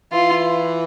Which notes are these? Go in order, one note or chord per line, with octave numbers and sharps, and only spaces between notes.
E3 F4